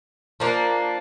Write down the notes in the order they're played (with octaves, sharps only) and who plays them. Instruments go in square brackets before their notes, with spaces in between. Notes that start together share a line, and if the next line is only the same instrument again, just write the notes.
[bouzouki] F3 A#3 D4